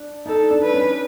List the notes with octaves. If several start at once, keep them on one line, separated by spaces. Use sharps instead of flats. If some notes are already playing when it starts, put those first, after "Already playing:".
Already playing: D4
D#4 A4
D4
B4
C#4